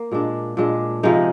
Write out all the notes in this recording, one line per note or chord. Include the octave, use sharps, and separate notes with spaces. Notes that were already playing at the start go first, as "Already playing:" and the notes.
Already playing: A#3
A#2 G#3 D4
A#2 G#3 D4
C3 F3 G#3 D#4